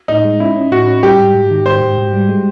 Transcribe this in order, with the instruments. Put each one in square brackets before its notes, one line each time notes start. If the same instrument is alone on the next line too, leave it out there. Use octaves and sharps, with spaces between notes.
[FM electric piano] A2 [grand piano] D#4
[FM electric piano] G#3
[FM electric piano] C#4 [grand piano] E4
[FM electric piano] C#4
[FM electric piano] A2 [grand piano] F#4
[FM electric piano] C#4
[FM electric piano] G3 [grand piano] G4
[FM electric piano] G#2
G#2
D#3
[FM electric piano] G#2 [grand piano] C5
[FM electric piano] G#2
G#2
G3
G#3